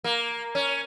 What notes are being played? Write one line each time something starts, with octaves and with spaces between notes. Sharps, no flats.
A#3
C#4